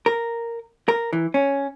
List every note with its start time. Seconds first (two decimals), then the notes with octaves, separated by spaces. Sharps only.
0.06 A#4
0.88 A#4
1.13 E3
1.34 C#4